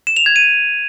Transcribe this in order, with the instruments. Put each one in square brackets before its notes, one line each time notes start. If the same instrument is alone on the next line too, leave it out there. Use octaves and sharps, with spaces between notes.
[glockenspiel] E7
F7
G#6
D#7